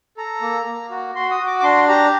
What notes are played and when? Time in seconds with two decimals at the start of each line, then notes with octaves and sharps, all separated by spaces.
0.17 A4 A#5
0.41 A#3
0.66 A#3
0.90 F#4
1.15 F#4 C6
1.31 D#6
1.40 F#4
1.47 D6
1.60 D6
1.63 D4 C6
1.88 G4 A#5